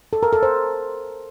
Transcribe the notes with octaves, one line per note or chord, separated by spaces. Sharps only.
A4
A#4
A4
C5